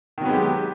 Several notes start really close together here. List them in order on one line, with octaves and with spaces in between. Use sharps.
D#3 F#3 B3 G#3 G4